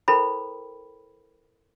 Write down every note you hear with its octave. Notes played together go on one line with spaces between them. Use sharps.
E4 A4 A#4 C5 G5 B5